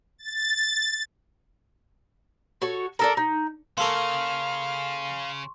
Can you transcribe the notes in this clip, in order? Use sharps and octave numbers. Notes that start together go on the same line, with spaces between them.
A6
F#4 A4 C#5
D4 A4 A#4
D#4
C#3 A#3 A4 A#4 F5 C6 C#6